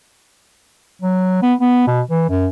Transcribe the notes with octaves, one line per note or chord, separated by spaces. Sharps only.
F#3
B3
B3
B2
E3
F#2